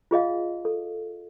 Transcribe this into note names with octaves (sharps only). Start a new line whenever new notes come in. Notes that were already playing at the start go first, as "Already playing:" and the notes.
F4 G#4 D#5 F5
A4